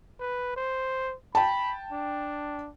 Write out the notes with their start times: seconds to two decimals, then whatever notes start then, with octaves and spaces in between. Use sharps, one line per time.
0.19 B4
0.56 C5
1.35 G5 A5 B5
1.92 D4